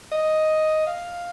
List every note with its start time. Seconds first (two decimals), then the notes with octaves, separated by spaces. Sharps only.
0.12 D#5
0.87 F5